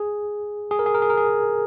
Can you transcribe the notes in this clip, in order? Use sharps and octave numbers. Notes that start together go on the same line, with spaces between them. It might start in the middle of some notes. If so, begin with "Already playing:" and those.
Already playing: G#4
G#4
A#4
G#4
A#4
G#4
A#4
G#4